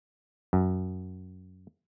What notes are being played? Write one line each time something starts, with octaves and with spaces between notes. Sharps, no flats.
F#2